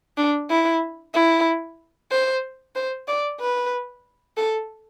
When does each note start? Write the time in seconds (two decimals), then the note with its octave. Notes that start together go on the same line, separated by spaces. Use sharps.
0.17 D4
0.50 E4
1.14 E4
2.11 C5
2.76 C5
3.08 D5
3.40 B4
4.37 A4